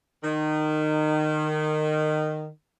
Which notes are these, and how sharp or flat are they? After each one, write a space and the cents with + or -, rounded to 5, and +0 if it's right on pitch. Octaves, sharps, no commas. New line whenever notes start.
D#3 -20